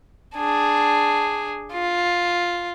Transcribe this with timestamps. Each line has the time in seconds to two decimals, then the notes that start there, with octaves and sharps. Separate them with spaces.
0.35 D4 G#4
1.73 F4